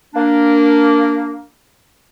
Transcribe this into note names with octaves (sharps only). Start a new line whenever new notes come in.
A#3 D4